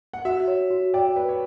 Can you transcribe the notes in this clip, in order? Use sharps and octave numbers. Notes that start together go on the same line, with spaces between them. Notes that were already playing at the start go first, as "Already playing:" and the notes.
F#5
F#4 E5
C#5
F#4
D5 G5
B4 G5
C#5